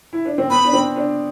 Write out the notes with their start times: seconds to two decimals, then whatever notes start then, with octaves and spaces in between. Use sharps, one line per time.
0.13 E4
0.25 D4
0.38 C4
0.50 B3 B5
0.65 D4
0.73 C4
0.96 D4